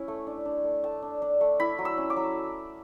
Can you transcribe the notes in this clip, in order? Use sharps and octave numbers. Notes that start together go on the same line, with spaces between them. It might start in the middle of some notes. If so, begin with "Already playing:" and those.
Already playing: C#4 E4
A3
D4
D4
A3
A3 A5
D4
D4
A3
E4 B5
F#3
E6
C#4
D6
F#3